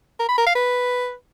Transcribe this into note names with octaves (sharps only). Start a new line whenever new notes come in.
A#4
B5
A#4
F5
B4